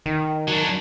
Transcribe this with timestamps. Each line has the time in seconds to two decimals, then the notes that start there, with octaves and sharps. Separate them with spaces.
0.06 D#3
0.48 F#3 D4